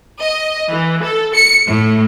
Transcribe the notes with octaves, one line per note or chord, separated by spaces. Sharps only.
D#5
E3
A4
C#7
A2